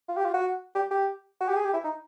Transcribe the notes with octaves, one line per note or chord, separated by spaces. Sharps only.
F4
G4
F4
F#4
G4
G4
F#4
G4
G#4
G4
E4
D#4